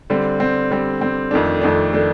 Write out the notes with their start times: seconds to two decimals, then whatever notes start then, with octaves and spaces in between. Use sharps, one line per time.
0.10 D3 G3 C4
0.40 D3 G3 C4
0.70 D3 G3 C4
1.01 D3 G3 C4
1.31 F2 D#3 A3 D4
1.61 F2 D#3 A3 D4
1.93 D#3 A3 D4